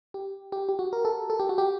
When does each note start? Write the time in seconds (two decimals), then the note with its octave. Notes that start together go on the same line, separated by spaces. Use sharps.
0.14 G4
0.52 G4
0.69 G4
0.79 F#4
0.93 A#4
1.05 A4
1.30 A4
1.40 G4
1.49 F#4
1.58 G4